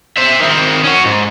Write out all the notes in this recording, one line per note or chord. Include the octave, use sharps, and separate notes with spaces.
C5 E5
D#3 C4
C#4 F#4
G#2